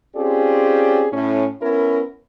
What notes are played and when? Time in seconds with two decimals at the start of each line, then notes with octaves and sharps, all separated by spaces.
0.16 C4 C#4 F4 G4 G#4 D5
1.12 A2 C#4
1.62 B3 C#4 E4 A#4